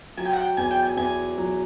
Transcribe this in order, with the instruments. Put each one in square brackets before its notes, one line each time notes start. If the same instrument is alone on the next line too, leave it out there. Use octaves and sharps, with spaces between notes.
[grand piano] F#3 [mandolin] G#5
[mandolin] G5
F#5
G5
[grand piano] E2 [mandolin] G#5
[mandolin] G5
G#5
[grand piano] E2 [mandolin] G#5
[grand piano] F#3